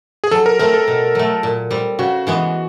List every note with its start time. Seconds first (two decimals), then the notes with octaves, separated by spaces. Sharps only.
0.24 G#4
0.31 F#3 A4
0.46 A#4
0.59 A3 C4 A#4
0.74 A4
0.88 B2
1.15 F#3 A3
1.43 A#2
1.71 G3 C4
1.99 C#3 F#4
2.27 E3 G#3 B3